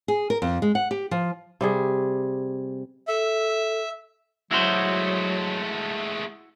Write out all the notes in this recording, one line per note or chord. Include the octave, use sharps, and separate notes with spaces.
G#4
A#4
F2
G#3
F#5
G4
F3
C3 G3 G#4
A4 E5
F#3 G#3 A3 E4 F#4 C5